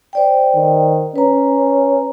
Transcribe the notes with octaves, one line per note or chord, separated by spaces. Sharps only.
C5 D5 G5
D#3
C#4 B4 A#5